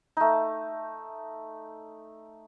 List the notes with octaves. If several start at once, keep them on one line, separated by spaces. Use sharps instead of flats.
A3 D#4